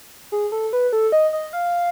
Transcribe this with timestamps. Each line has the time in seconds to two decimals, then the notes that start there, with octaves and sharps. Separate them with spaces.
0.32 G#4
0.52 A4
0.73 B4
0.93 A4
1.12 D#5
1.33 D#5
1.53 F5